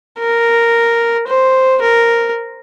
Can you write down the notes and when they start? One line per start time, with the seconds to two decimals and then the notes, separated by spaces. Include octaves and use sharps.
0.18 A#4
1.28 C5
1.82 A#4